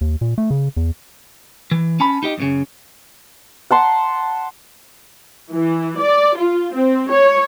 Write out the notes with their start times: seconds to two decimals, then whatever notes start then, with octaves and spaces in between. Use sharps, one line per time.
0.01 D#2
0.21 A#2
0.38 A3
0.50 C#3
0.76 E2
1.71 E3
2.00 C#4 A5 B5
2.23 D#4 G4 D#5
2.38 F#2 A#2 C#3
3.71 F#5 A5 C6
5.51 E3
5.99 D5
6.37 F4
6.73 C4
7.10 C#5